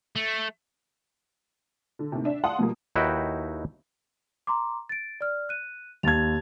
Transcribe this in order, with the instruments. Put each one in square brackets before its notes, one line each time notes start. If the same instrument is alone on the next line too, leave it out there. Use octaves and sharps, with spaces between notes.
[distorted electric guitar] A3
[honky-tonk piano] D3
D#2 A2 C3
D4 E5
D5 F5 F#5 A5 C6 D#6
B2 F3 G3 A#3
[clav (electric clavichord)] D#2 D#4 E4 F#4 B4 G5
[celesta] A#5 C6 D6
A6 D7
D5 F6
F#6 D#7
[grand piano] D#2 G#6 [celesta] A5 A6 F7